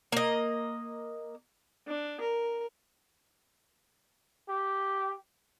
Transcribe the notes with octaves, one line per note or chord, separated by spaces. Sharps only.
A#3 D#5
D4
A#4
G4